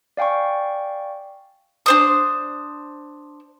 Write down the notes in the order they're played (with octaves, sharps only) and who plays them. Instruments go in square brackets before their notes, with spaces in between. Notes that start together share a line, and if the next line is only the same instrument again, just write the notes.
[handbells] D5 F5 G5 G#5 C#6
[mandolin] D4 C5 D#6